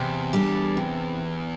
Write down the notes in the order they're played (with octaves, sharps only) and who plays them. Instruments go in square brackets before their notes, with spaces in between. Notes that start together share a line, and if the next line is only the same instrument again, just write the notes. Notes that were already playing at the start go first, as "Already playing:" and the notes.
Already playing: [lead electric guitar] E2 [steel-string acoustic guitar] C3
[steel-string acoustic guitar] G3 D4 A4
C3